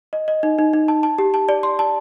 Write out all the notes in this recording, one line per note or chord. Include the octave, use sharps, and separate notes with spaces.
D#5
D#5
D#4
D#4
D#4
A5
A5
G4
A5
D5
C6
A5